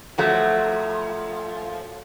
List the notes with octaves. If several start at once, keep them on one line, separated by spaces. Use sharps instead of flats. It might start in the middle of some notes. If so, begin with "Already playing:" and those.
F3 F#3 A3